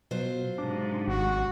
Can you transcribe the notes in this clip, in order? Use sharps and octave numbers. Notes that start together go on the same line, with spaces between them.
B2 F#3 F4 C5
G#2 C3 D4
G#1 F#4